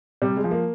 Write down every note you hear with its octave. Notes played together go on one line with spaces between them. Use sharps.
C3 G3
G#3
F3
A#3